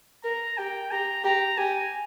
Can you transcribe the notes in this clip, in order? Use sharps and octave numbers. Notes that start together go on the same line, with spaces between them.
A#4 A#5
G4 G5
G4 A#5
G4 A#5
G4 G#5